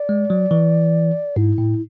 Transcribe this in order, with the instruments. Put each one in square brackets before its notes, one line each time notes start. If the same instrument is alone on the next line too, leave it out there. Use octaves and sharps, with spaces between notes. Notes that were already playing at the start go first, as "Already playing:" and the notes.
Already playing: [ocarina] D5
[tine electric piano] G#3
F#3
E3
[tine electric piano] G#2 [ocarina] E4
[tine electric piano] A2